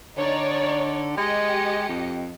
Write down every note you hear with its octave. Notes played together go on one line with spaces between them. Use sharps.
D3 D#4 C#5 D5
G#3 G4 D#5 C#7
F2